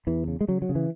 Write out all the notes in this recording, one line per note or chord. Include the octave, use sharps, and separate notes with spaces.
E2 E3
C#3
G#3
C#3 F#3
F#3
C#3
E3